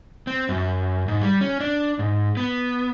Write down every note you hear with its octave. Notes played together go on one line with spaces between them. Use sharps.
C4
F#2
G#2
G3
C#4
D4
G#2
B3